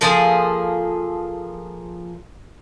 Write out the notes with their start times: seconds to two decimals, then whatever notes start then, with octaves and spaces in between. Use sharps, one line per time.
0.01 F3 A#3 G#4 A4